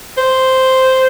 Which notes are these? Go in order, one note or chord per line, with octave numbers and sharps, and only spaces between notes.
C5